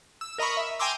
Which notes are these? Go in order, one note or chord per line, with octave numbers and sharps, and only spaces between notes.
E6
A#4 D#5 A#5 B5 C#6
E5
G5 G#5 A#5 C6 D6 E6